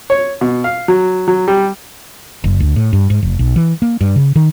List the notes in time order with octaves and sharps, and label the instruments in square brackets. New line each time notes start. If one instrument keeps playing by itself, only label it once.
[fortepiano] C#5
B2
F5
F#3
F#3
G3
[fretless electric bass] F#1
D2
A2
G2
G#2
F1
B1
E3
A#3
G2
C#3
D#3